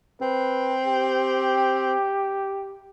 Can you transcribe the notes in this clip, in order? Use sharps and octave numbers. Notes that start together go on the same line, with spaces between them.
C4 B4
G4